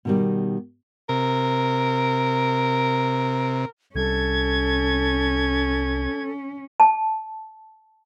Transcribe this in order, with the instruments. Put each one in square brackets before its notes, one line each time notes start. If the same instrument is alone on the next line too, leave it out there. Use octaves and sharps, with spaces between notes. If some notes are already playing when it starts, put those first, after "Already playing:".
[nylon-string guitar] B2 D#3 G3
[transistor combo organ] C3 [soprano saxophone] A#4
[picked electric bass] C2 G3 [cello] C#4 [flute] A4 [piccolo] G#6
[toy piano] A5